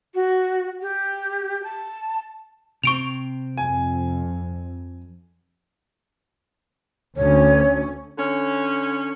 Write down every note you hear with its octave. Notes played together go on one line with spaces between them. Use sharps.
F#4
G4
A5
C3 C4 C#6 D7 F7
F2 G#5
D2 C#4 C#5
D3 C#4